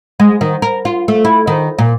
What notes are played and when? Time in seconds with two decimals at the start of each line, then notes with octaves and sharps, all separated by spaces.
0.20 G#3
0.41 D#3
0.62 A#4
0.85 F4
1.08 A3
1.25 E4
1.47 D#3
1.79 A#2